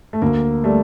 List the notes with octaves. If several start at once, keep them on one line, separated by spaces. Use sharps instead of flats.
A3
D2 A#3
G3 A3